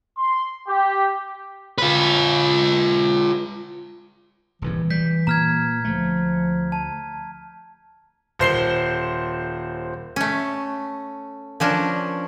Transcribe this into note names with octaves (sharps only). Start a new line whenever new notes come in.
C6
G4
F4 B4
D#1 C2 G#2 E3
G3 G6 B6
A#2 A#5 F6 G#6
D2 F3 A3
A5
D#1 C5 C7 G7
A3 C#4
F3 C#4 D4 A#4